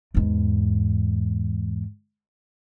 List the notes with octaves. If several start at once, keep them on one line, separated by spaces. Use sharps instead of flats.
E2 G#2